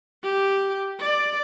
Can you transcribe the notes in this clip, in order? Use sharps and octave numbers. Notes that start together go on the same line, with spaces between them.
G4
D5